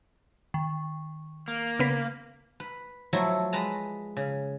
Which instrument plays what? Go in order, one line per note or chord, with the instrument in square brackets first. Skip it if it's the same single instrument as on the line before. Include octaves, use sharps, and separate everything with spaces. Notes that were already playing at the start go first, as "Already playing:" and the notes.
[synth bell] D#3
[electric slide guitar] A#3
[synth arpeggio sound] C#3 B3 B6
[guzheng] B4
F3 F#3 A3 E4
G#3 B4 A5 A#5
C#3